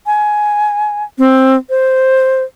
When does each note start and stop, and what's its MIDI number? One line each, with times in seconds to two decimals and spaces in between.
0.06 1.04 80
1.18 1.56 60
1.70 2.43 72